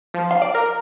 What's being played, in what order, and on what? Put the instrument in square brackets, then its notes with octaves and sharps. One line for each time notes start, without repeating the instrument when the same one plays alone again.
[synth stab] F3
[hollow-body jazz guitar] F5
D5
[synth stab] A#4